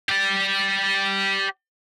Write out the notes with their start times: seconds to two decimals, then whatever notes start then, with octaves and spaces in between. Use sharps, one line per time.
0.09 G4 D5